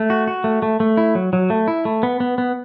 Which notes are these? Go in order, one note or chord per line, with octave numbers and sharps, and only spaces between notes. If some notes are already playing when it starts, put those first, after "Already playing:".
Already playing: A3
F#4
F#4
A3
A3
A3
E4
F#3
F#3
A3
E4
A3
B3
B3
B3